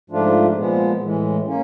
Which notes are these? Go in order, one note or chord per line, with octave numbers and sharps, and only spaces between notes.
G#2 F3 A3 D4 F4
A#2 F3 G#3 B3
A2 E3 G#3
A#3 C#4